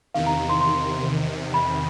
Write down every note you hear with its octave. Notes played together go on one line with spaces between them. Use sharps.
E2 C3 D#3 F5
A#5
C6
C6
B5